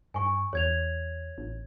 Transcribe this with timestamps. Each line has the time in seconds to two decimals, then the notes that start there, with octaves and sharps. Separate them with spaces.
0.14 G2 G#5 C#6
0.53 E2 C#5 G#6 F7
1.38 A1